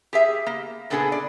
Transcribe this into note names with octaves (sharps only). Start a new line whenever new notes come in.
G4 G#4 E5
A#3
A#2 A#3 B3 D4 G#4 A4
D5